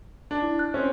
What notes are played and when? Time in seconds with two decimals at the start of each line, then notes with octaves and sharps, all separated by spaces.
0.31 D4
0.42 E4
0.59 F#6
0.74 C4 C#4